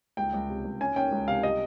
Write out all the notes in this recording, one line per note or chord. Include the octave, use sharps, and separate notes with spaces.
C#2 G5
C#2
C3
C#2
C#4 G#5
C#4 G5
C#2
C3 F5
G3 D#5